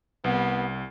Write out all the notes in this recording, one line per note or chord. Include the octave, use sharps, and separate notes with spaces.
C2 B3